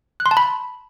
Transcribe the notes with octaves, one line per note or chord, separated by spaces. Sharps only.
F#6
C6
A5
B5